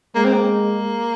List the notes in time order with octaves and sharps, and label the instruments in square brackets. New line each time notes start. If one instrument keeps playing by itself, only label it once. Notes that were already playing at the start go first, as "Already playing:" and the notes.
[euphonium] G#3 [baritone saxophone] A#3
[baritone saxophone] C4
A#3